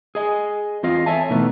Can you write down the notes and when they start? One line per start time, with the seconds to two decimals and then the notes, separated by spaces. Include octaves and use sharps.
0.15 G#4 D#5 G#5
0.83 E2 C4 F4 D#5 F5
1.06 A4 C#5 E5 G#5 A5
1.29 E2 B2 D#3 E3 A3 B3